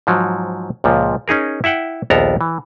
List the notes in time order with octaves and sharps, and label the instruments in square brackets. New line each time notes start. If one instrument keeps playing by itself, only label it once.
[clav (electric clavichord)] G#2 F3 F#3
C#2 A#2 F3
C#4 D#4 G#4 A#4
E4 E5 F#5 G5
A#1 D#2 B3 A4 A#4 A#5
E3